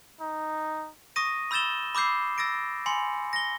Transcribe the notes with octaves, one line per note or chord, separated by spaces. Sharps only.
D#4
C#6 D#6 A#6 D#7
B5 E6 G6 A6 E7 G7
B5 D6 E6 G6 C7
E6 A6 A#6 D7
G#5 B5 C6 C#7
A#6 G7